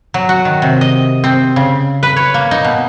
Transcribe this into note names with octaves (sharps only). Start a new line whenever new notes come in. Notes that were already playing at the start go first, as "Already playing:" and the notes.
F#3
F#4
D#3
C3
D#5
C4
C#3
B4
C#5
A#3
D#4
B2